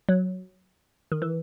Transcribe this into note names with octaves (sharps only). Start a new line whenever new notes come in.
F#3
D#3
E3